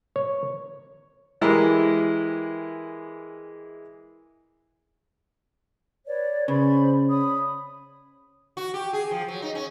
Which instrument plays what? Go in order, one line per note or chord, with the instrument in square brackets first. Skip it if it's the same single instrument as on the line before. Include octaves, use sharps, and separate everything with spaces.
[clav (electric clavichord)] C#5
[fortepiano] E3 G#3 E4 G4 A#4 A#5
[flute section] B4 C#5 D5
[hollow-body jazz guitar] C#3 [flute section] C5 D5 B5
[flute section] C#5 B5 D#6
[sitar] F#4
G4
G#4
F3
F#3
D#4
C#4